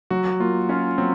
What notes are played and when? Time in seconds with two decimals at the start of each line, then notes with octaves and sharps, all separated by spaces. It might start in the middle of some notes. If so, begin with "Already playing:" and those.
0.10 F#3 F#4
0.40 A#3 F4
0.69 C#4 F4
0.98 F#3 C4